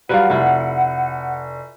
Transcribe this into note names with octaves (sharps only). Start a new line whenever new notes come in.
F#3 G3 F4 B4 F5 F#5
F1 E4 F4